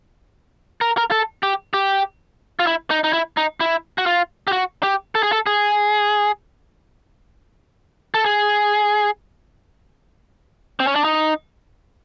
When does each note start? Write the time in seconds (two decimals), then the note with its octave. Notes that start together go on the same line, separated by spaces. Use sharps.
0.81 A#4
0.97 A#4
1.11 A4
1.43 G4
1.74 G4
2.59 F4
2.67 E4
2.91 D#4
3.04 D#4
3.13 E4
3.37 D#4
3.60 E4
3.98 F#4
4.06 F4
4.48 G4
4.52 F#4
4.83 G4
5.15 A4
5.23 G#4
5.32 A4
5.46 G#4
8.14 A4
8.26 G#4
10.80 C4
10.87 C#4
10.96 D4
11.04 D#4